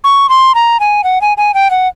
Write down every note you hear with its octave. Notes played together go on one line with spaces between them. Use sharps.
C#6
C6
A#5
G#5
F#5
G#5
G#5
G5
F#5